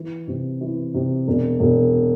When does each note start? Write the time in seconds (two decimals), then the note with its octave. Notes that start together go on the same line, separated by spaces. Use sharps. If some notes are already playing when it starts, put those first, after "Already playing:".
Already playing: E3
0.28 C3
0.61 E3
0.94 C3
1.27 E1
1.60 E1